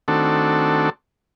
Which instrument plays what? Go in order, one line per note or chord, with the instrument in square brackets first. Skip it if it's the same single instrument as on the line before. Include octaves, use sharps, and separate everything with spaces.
[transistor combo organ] D#3 A3 C4 D4 F#4 A4